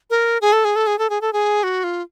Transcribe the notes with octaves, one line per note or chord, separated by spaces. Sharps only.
A#4
G#4
A4
G#4
A4
G#4
A4
G#4
A4
G#4
F#4
F4